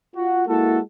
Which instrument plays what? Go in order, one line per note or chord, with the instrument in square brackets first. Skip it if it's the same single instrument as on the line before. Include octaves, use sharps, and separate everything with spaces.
[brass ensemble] F4 F#4
G#3 A#3 E4 F#4 A4